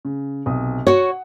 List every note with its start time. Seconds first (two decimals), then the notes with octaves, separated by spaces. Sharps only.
0.05 C#3
0.46 B1 C3 D#6
0.87 F#4 C#5 F#5